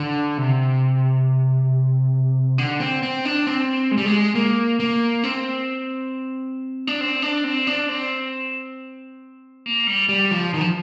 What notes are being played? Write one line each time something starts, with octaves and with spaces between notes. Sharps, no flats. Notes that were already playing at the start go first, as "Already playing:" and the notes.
Already playing: D3
C3
D3
C4
C4
D4
C4
G#3
G3
G#3
A#3
A#3
C4
D4
C4
D4
C4
D4
C4
A#3
G3
G3
F3
D#3
F3